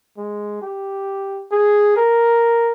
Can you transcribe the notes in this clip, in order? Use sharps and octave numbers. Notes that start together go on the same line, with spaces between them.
G#3
G4
G#4
A#4